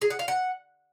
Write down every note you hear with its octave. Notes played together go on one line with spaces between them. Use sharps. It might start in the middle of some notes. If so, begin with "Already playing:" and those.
G#4
F#5
F5
F#5